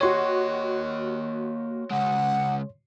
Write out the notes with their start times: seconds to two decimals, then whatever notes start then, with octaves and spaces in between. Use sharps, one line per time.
0.01 A#3 F#4 G4 C#5 D#5 C6
1.90 C#3 G#3 F#5